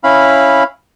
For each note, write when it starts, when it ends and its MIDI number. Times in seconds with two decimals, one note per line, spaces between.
0.04 0.63 61
0.04 0.63 64
0.04 0.63 77
0.04 0.63 83